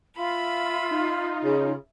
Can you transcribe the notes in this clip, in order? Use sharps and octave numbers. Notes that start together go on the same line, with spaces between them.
F4 E5 B5
D#4
C#3